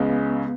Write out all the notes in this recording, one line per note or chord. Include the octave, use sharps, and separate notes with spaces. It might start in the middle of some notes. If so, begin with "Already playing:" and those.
Already playing: C#2 C#3 G#3 B3